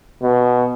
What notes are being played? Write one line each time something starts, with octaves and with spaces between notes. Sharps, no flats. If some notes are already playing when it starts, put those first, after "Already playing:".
B2